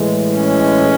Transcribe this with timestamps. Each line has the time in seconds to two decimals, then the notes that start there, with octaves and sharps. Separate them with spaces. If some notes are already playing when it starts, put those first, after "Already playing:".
Already playing: A2 E3 G#3
0.35 C#4